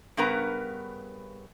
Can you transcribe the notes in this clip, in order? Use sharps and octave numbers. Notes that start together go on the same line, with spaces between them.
G2 C#3 B3 A#4 B4 A#5